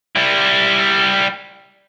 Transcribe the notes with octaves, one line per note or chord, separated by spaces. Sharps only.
G3 E4